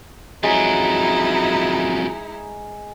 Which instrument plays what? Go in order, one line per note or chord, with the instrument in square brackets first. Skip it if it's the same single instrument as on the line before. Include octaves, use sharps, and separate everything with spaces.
[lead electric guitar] F2 F#3 [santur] G#3 [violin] D#4 E4